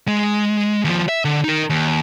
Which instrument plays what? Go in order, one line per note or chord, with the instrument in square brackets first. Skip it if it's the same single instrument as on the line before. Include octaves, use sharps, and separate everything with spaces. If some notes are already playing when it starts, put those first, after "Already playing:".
[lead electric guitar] G#3
D#2 F3
E5
D3
D#4 A#4
D#2